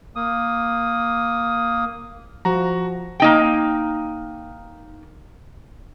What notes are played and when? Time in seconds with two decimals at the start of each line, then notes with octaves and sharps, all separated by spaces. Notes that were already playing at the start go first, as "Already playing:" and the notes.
0.16 A#3 D#6
2.45 F3 F#4 A#5
3.20 A#3 D#4 G5